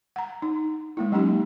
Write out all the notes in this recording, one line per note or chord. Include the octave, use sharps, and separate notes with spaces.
F#5 A#5
D#4
G#3 A#3 E4
F#3 A#3 C#4 D#4 G4